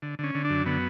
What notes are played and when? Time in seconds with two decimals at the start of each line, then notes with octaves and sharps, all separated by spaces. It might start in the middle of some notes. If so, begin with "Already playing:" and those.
0.02 D3
0.19 D3 C#4
0.35 D3
0.45 D4
0.50 F#2
0.66 D3 B3